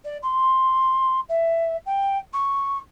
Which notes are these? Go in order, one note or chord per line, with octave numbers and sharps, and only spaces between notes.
D5
C6
E5
G5
C#6